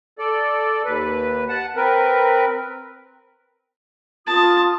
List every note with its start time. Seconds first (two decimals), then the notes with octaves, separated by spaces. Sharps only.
0.19 A4 D5
0.85 D#2 B4
1.49 F#5 A5
1.76 C4 A#4 B4
4.27 F4 A5 D#6